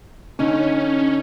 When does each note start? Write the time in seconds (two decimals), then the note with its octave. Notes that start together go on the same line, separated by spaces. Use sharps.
0.39 D3 C#4 D#4